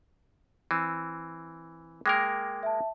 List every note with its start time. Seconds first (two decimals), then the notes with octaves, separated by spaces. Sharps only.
0.71 E3 C4
2.06 G#3 A#3 A#4 G5 D6
2.63 E5 A5